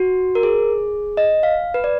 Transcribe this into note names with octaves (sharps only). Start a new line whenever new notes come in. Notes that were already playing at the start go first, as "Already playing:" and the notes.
Already playing: F#4
A#4
G#4
D#5
F5
B4
D5